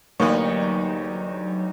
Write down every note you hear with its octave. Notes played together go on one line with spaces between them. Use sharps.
D2 E3 F#3 G3 A#3 D#4 B4 C#6